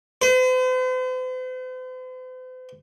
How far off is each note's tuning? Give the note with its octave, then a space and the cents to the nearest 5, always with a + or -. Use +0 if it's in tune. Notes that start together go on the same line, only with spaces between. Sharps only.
C5 -45